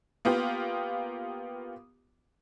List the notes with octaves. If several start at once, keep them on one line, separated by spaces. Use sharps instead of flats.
A#3 B3 F4 G4